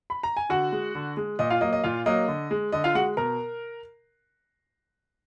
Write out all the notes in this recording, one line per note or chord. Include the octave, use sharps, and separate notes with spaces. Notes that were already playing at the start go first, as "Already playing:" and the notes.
B5
A#5
G#5
D3 F#4 F#5
G#3
D3
G#3
A#2 D#5
F4 F5
F#3 A#3 D#5
D#5
A#2 F4 F5
F#3 A#3 D#5
D3
G#3
D3 D#5
F4 F5
G#3 F#4 F#5
B2 A#4 A#5